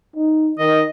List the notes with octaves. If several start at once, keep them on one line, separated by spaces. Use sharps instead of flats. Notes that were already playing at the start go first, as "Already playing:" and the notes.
D#4
D#3 D#5